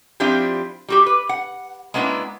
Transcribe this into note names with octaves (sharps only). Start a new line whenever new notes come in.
F3 C4 D4 E4 F4 G4
G3 F#4 G4
B4
F#5
G#3 A#3 B3 C#4 D4 E4